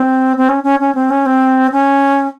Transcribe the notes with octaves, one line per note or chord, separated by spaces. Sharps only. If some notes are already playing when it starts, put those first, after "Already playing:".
Already playing: C4
C4
C#4
C#4
C#4
C4
C#4
C4
C#4